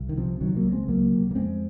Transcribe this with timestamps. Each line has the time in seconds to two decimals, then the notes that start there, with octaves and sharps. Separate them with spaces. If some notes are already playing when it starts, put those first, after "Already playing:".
Already playing: C2
0.09 D#3
0.17 C3 F3
0.40 C3 D#3 F#3
0.56 F#3 A#3
0.65 C#2
0.72 G#3 C4
0.88 C#2 F#3 A#3
1.12 C3
1.31 A#3
1.35 F2 G#3 C4